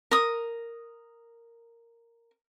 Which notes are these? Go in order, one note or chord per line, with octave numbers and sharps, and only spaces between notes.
A#4 D#6